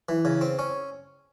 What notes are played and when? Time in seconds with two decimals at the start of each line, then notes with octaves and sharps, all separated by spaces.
0.09 E3
0.25 C#3
0.41 C4
0.59 C#4